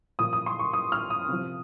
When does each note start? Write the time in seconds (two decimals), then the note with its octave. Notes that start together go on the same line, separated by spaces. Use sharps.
0.19 A#2 F3 D#6
0.33 D#6
0.46 C6
0.59 C#6
0.73 D#6
0.92 F6
1.10 D#6
1.29 C3 F3